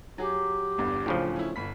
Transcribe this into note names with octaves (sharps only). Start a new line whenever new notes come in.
F#3 G4 G#4
G1 E2 G2
D1 A2 C#3 F3 D4
C#4 E4
G1 B5 B6